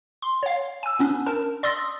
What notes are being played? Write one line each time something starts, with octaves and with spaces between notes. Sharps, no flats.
C6
C#5 F5
G#5 E6
B3 C#4 D4
A#4 A5
D5 C6 D#6 E6 A#6